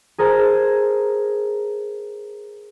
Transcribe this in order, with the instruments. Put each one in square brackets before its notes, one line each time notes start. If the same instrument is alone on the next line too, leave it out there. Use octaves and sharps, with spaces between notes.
[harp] G#4 A#4 C5 A5